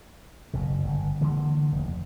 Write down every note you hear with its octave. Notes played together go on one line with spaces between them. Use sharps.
F#1 B2
G1
D3 E3 G#3 A#3
F1 D#2